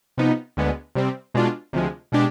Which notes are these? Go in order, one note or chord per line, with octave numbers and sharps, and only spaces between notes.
C3 F3 B3 D#4
D2 D3 G#3 B3
C3 G3 C4
B2 G#3 D4 F4
D2 C3 F3 G#3
B2 G#3 D4 G4